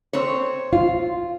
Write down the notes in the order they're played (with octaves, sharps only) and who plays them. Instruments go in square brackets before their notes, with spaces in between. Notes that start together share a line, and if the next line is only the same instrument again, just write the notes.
[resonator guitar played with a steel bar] C4 C#5
[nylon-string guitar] F4